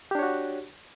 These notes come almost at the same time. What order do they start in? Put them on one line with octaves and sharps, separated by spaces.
G4 D4 C#5 F#4